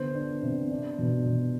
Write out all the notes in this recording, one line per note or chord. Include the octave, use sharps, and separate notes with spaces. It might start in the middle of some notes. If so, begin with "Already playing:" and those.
Already playing: D3 B3 C5
D4
C3
D4
B2
B2